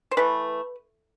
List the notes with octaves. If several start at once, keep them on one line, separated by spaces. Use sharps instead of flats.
C5
E3 A3 B4